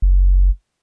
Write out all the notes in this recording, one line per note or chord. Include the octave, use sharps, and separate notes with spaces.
F#1